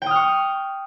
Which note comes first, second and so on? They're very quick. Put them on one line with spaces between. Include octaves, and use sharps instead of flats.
G5 D#6 F6 C#6